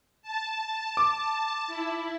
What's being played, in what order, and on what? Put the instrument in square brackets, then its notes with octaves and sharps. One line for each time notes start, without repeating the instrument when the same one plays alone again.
[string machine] A5
[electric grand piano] D6
[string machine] E4